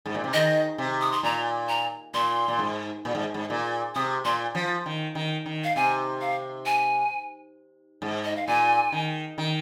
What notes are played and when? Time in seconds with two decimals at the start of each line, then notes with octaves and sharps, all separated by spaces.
0.06 G#2
0.14 A#2
0.24 C3
0.34 D#3 D#5
0.78 C3
1.01 D#6
1.12 C6
1.23 A#2 A#5
1.69 A#5
2.14 A#2 C6
2.48 A#2
2.59 G#2
3.05 A#2
3.15 G#2
3.34 G#2
3.50 A#2
3.95 C3 D#6
4.25 A#2 C6
4.55 F3
4.86 D#3
5.15 D#3
5.46 D#3
5.64 F5
5.76 C3 G#5
6.21 F5
6.66 G#5
8.02 G#2
8.24 D#5
8.36 F5
8.47 A#2 G#5
8.92 D#3
9.38 D#3